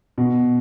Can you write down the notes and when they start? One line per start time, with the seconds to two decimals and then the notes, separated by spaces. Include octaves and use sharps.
0.18 B2